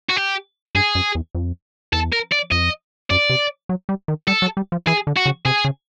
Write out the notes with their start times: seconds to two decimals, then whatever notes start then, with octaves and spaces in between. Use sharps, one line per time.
0.09 F#4
0.16 G4
0.75 G2 G#4
0.95 F#2
1.15 E2
1.35 F2
1.93 E2 A4
2.13 A#4
2.32 D5
2.52 F2 D#5
3.10 F#2 D5
3.30 C3
3.69 F#3
3.89 G3
4.08 D#3
4.28 G3 A4
4.42 F#3
4.57 G3
4.72 F3
4.87 E3 G#4
5.07 D3
5.16 F#4
5.26 C#3
5.46 C3 G#4
5.65 C#3